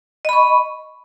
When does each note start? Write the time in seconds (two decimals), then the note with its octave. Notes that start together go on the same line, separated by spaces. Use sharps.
0.25 D#5
0.29 B5
0.33 C#6